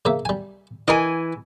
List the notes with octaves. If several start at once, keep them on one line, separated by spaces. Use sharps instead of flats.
C#3 A#3 E5
G3 G#5
E3 A#4 D#5 G#5